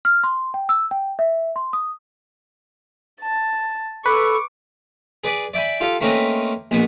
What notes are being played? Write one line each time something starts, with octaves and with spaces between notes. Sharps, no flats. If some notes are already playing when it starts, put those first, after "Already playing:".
F6
C6
G5
E6
G5
E5
C6
D#6
A5
A4 B4 C#6 D6
G#4 B4 D5
D5 E5 G5 G#5 B5
F4 G4 A4 F5
A3 A#3 C4 C#4 B4 D#5
A#1 B2 B3 G#5